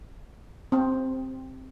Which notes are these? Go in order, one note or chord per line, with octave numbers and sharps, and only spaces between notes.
C4